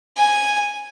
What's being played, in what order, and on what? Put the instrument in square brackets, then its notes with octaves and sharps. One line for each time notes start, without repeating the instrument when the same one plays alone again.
[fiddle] G#5